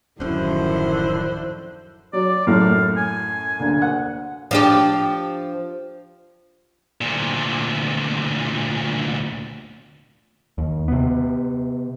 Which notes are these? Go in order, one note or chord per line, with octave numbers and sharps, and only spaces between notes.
D1 F#2 D3 D#3 F3 C#4 E4 C5
F#3 D5
F#2 A2 F5
G#5
D2 A#3
F#5
F3 D4 G4
D2 A#2
D#2
C3 B3